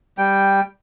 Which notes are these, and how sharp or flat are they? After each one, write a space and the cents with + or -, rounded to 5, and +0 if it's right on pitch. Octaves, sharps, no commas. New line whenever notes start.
G3 +0 G5 +0